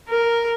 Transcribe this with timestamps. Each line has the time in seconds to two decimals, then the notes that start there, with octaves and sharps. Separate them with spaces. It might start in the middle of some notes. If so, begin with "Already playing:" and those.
0.09 A#4